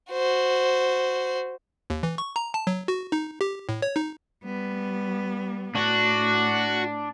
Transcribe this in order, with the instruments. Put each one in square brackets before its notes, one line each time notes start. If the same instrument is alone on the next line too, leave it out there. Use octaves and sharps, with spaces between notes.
[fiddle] F#4 C5
[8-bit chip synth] D#2
E3
C#6
A#5
A5
F#3
F#4
D#4
G4
A2
C#5
D#4
[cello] G3 B3
[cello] A2 [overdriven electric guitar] D4 [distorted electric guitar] F#4